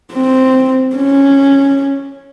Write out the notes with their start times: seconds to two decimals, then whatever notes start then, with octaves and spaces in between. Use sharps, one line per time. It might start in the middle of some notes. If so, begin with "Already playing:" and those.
0.13 C4
0.96 C#4